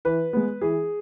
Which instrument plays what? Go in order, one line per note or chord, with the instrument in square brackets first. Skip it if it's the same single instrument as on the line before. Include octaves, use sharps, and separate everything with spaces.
[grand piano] E3 B4
G#3 B3
E3 G#4